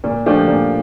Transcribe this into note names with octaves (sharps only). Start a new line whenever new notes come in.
A#2
F3 A3 D4 G4
A#2